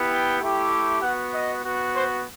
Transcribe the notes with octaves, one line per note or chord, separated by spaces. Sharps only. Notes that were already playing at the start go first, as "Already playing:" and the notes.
Already playing: B3 E4 G4
G5
A3 E4 G4
B3 F#4 F#5
D#5
B3 F#4
C5